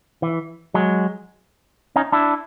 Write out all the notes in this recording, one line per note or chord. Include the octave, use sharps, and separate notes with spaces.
E3
F#3 G#3
C#4 D#4
D4 E4